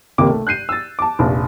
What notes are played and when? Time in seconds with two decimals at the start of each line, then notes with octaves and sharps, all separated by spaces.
0.18 G#1 C#2 C3 D#3 A#3 D6
0.30 A3
0.47 F#6 G6 C7 D#7
0.69 E6 A6
0.99 A5 D6
1.19 F1 A#1